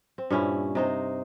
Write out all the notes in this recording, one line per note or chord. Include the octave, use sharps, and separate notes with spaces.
C4
G2 A#2 C#4 E4
C3 D#4 C5